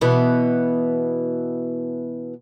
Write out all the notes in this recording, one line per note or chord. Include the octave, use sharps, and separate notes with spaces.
B2 E3 B3